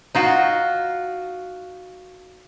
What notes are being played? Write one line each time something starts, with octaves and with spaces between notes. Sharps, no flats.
D#4 F4 F#4